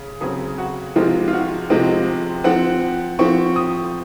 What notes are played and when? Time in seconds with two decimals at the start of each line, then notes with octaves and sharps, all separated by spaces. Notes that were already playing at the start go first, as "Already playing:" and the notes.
Already playing: C#3 G#4
0.21 C#3 F#3 C4 G#4
0.58 F#4
0.95 C3 F3 G#3 C4 F4
1.28 F4
1.33 F#4
1.70 C3 F3 G#3 C4 D#5
2.44 F3 C4 F#5
3.19 F3 C4 C#6
3.56 D#6